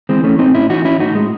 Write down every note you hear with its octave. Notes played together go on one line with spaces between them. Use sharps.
E3 G#3 C4
A3 C#4
A2 C4 D#4
C#4 E4
E3 D#4 F#4
C#4 E4
A2 D#4 F#4
G#3